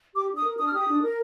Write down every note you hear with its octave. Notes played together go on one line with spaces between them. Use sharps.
G4 D6
D4
D#6
A#4
D4 D#6
F6
G4 D#6
D4
A#4